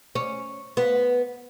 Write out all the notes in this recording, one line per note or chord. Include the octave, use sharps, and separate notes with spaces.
C#4
B3